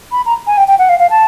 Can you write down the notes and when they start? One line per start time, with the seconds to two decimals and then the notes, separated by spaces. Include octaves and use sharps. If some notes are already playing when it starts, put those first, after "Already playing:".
0.12 B5
0.26 A#5
0.47 G#5
0.57 G5
0.68 G5
0.79 F#5
0.89 F5
1.00 F5
1.10 A5